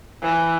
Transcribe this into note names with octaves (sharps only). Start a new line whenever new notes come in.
E3